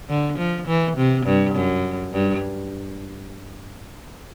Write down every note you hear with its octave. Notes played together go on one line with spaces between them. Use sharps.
D3
F3
E3
C3
G2
F#2
G2